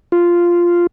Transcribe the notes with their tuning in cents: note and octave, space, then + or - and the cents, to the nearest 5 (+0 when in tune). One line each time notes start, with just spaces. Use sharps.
F4 -5